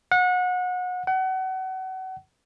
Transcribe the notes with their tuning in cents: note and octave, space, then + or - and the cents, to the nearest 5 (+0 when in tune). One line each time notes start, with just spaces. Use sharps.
F#5 -30
F#5 +30